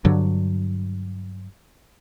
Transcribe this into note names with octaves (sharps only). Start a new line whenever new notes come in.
G2 D3 F#3